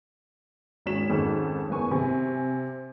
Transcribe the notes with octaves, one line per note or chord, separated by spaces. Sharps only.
G#1 F#3 C#4 C#5 B6 E7
F2 G#2 D#3 C#4
F#1 B3 G#5 C#6
C3 G#5